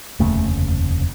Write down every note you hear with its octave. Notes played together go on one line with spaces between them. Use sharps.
F1 D#2 C#3 A3